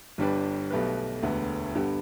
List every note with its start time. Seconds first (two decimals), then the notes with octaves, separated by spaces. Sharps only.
0.18 G1 G2 G3 D4 B4
0.70 B1 B2 A3 G4 B4
1.23 E1 D2 D3 B3
1.75 G2 D3 B3 G4